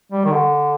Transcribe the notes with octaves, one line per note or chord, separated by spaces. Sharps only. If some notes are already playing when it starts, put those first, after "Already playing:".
G3
D#3
D3